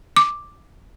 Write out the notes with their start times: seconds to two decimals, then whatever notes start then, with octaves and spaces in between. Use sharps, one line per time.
0.17 D6